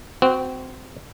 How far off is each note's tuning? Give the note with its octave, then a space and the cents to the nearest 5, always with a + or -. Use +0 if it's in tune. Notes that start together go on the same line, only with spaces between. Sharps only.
C4 -20 F#4 +0